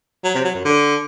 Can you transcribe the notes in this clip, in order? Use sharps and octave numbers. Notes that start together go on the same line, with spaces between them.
F#3
C3
F#3
F#2
D3